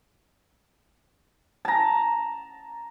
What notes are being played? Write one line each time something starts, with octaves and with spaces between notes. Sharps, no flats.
A5 A#5